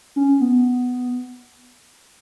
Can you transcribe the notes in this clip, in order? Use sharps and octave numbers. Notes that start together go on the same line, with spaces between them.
C#4
B3